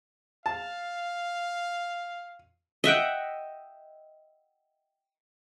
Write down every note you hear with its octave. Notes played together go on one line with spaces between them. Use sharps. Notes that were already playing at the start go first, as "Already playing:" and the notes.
F5 A5
D#5 E5 F#5 G5